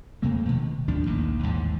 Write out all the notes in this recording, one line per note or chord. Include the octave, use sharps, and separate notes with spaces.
F2 C#3 A3 A#3
B2 D#3
D#2 A2 F3 D4
A#1 D#2 G#2
D#2 G#2 E3 F3